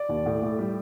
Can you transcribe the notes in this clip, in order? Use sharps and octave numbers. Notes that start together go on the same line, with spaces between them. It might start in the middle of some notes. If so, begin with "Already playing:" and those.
Already playing: D5
D#2
A2
A2
G3